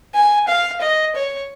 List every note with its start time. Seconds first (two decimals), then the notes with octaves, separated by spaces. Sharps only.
0.15 G#5
0.48 F5
0.81 D#5
1.15 C#5